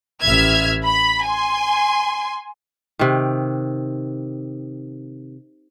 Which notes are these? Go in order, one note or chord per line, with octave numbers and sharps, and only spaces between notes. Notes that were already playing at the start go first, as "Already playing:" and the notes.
A1 E5 F6 G#6
B5
G#5 C6
C3 D#3